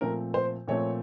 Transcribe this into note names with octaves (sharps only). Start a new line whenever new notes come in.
A#2 F3 A3 C4 A#4
C5
A#2 F3 A3 C4 C#5